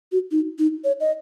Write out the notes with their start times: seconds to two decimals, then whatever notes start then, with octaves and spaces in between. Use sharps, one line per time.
0.12 F#4
0.31 D#4
0.59 D#4
0.84 C#5
1.00 D#5